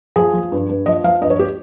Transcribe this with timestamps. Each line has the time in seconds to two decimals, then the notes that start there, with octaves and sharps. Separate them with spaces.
0.16 F3 G#4
0.33 F3
0.52 G2
0.69 G2
0.86 F3 D#5
1.04 F3 F5
1.21 G2 D#5
1.30 C#5
1.39 G4